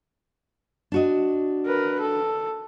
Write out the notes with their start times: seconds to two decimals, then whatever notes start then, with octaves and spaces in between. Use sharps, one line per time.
0.92 D4 F#4 D#5
1.66 A#4 B4
2.00 A4